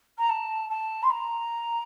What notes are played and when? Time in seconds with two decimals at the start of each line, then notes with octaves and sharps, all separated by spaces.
0.18 A#5
0.29 A5
0.70 A5
1.03 C6
1.10 A#5